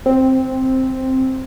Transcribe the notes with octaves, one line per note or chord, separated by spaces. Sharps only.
C4